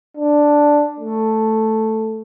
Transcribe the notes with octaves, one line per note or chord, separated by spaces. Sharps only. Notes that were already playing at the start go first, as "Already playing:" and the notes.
D4
A3